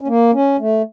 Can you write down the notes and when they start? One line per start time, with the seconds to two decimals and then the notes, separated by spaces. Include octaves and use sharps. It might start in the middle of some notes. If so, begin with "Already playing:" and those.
0.01 C#4
0.08 A#3
0.33 C#4
0.59 A3